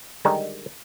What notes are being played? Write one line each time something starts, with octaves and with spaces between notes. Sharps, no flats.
D3 D#3 G3 G#3 D#4